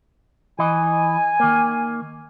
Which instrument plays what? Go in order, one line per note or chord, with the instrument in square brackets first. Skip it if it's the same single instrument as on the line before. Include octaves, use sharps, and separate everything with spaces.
[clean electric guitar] E3 D#5 [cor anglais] G#5
[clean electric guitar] D#3 A#3